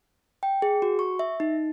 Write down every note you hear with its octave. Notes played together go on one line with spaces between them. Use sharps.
G5
G#4
F#4
C#6
E5
D#4